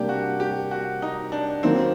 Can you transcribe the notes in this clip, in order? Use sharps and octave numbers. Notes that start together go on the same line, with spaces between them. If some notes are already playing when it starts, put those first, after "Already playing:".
Already playing: C3 G3 A#3 D4 G4
F#4
G4
F#4
D#4
D4
D#3 F#3 A#3 C4 D#4